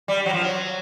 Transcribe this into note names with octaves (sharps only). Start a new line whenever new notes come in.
G3
F#3
F3
F#3